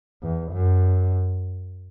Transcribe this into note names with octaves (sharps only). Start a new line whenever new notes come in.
E2
F#2